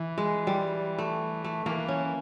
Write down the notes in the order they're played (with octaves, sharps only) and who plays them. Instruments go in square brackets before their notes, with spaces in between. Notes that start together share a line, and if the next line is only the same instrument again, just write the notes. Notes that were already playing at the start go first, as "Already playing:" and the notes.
Already playing: [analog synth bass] E3
[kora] G#3
G3
A3
A3
[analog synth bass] E3 [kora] A#3
[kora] C#4